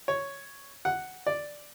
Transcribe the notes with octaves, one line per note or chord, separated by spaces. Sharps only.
C#5
F#5
D5